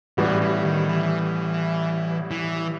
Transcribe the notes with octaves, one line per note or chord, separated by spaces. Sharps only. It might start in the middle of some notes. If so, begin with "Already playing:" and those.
A1 A2 E3 G3 B3 F#4
E3
D#3
E3
E3